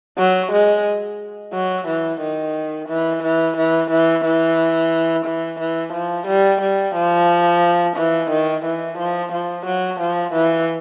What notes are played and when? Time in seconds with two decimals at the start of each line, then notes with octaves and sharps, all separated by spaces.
0.18 F#3
0.52 G#3
1.54 F#3
1.88 E3
2.21 D#3
2.89 E3
3.23 E3
3.57 E3
3.91 E3
4.25 E3
5.26 E3
5.60 E3
5.93 F3
6.27 G3
6.61 G3
6.95 F3
7.97 E3
8.30 D#3
8.65 E3
8.98 F3
9.33 F3
9.66 F#3
10.00 F3
10.34 E3